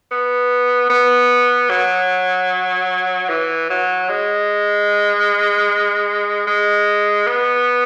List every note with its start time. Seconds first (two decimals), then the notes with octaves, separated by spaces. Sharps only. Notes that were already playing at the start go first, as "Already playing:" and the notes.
0.11 B3
0.90 B3
1.70 F#3
3.29 E3
3.70 F#3
4.09 G#3
6.47 G#3
7.27 B3